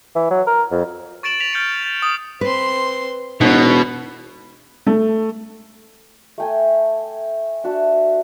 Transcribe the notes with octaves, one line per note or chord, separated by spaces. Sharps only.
E3
F#3
A#4
F2
C#6 A6 D7 E7 F#7
A6 B6 F7
F6 G6 A6 B6 C#7 D7
A6
D#6
C4 B4 C6
E1 B2 D#4 C#5
A3
A3 G5 G#5
D4 F#4 E5